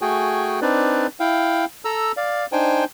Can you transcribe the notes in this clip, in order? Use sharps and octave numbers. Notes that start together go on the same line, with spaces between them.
A3 F#4 G#4 G5 G#5
C4 D4 D#4 B4 D5
E4 F5 G5
A4 A#5 E6
D5 F5
D4 D#4 C5 G5 G#5